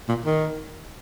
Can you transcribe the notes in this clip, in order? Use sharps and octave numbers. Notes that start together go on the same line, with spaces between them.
A#2
D#3